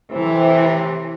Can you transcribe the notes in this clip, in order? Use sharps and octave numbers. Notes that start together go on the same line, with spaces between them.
A2 C3 E3